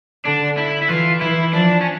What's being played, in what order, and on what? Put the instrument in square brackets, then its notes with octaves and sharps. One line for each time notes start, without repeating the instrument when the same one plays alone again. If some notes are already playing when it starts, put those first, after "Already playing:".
[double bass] D3 [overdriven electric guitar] D4
[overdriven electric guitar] E4
E4
[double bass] E3 [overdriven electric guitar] F4
[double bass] E3 [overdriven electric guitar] E4
[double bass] F3 [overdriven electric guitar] D4
[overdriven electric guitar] C#4